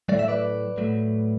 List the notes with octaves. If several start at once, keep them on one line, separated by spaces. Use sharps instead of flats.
A2 F#3 A3 D5
E5
B4 D5
A2 F#3 A3